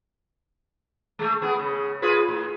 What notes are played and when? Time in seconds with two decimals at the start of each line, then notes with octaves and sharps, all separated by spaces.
1.19 G#3 A3
1.42 B3 G#4
1.59 C#3
2.02 F4 G#4 B4
2.29 A2